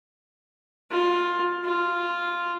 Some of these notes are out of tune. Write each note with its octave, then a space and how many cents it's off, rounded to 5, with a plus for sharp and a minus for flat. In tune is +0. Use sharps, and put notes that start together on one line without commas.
F4 +10
F4 -5